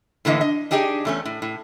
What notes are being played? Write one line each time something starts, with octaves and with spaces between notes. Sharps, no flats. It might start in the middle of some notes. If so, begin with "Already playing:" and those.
A2 D3 E3 A#3 D#5
D#5
D4 D#4 G4 G#4 D#5
E2 A3 C#4
A2
A2